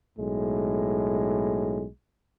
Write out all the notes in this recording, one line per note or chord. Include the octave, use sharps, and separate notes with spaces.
B1 A2 G#3